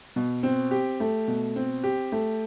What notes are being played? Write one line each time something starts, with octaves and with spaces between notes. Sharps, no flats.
B2
C4
G4
A3
B2
C4
G4
A3